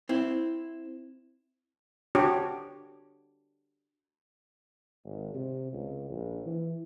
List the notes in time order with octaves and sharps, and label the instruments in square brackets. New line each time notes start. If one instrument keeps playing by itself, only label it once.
[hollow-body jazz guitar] C4 E4
[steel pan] D4 F#4 G4 C#5
[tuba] G#1
C3
C#2
A#1
E3